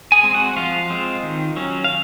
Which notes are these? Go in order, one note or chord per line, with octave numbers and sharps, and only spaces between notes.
G#4 G#5
G#3 C4
F#4 F#5
F3 F4 F5
G#3 C4
D#3
F#3 C#4
F5